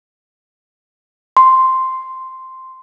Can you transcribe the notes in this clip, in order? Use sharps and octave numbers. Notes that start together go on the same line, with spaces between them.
C6